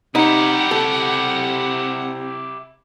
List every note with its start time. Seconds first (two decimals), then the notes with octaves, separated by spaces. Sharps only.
0.15 C3 D#4 E4 G4 F#5
0.71 C3 A4